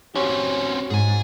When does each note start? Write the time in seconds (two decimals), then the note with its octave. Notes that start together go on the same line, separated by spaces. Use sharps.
0.15 C4 C#4 F#4 G4 C#5
0.90 G#2 G#4 G#5